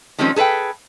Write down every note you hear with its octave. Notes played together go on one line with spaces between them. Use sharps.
D#3 F3 G3 G#3 C4 C#4
G#4 A4 B4 F5 G5